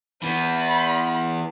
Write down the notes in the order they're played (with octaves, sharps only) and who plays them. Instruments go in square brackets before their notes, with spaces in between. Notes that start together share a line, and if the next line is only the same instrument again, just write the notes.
[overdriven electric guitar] E3 B3 [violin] B5